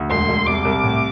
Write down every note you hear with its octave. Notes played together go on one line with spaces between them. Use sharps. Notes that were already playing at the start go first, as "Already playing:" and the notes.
Already playing: D2
E1 C6
E1
C2 D6
C2
A2